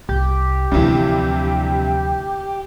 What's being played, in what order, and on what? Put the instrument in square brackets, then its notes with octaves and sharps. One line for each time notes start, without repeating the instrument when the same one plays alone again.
[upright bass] C2 [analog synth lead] G4
[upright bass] D2 F3 [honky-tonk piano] G2 C3 E3